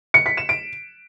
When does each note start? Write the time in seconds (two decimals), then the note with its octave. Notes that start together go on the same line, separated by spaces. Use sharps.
0.14 C#7
0.26 B6
0.37 E7
0.49 D7